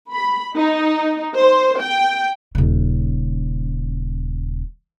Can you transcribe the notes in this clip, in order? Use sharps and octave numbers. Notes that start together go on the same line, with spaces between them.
B5
D#4
C5
G5
D#1 C#3